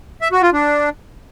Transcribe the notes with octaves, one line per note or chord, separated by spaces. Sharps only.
E5
F#4
F4
D4